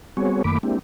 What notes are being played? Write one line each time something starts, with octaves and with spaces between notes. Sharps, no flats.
G3 B3 C4 F#4 G#4 C#5
F#2 D#3 A3 A#3 B5 D6
G#3 A#3 C4 D4 E4 G4